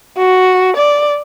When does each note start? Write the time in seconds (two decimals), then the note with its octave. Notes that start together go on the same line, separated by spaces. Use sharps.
0.18 F#4
0.76 D5